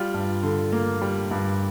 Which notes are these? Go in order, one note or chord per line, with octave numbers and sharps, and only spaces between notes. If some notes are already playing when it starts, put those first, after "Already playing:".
Already playing: G3 F4
G2
D3
A#3
G3
G2